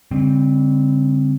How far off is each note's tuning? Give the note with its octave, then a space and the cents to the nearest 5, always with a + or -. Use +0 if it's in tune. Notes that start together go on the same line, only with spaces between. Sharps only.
D3 -45 G3 +45 C4 +0